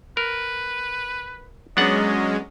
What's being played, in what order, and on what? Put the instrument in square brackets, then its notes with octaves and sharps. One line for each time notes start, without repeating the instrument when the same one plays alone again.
[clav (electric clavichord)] A#4 [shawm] B4
[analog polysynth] F#3 G#3 C#4 [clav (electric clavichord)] B3 D4 F#5 [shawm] D#5